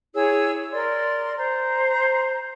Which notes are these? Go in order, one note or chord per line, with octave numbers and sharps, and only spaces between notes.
E4 G#4 C#5 E6
A#4 D5 C6
C5 A#5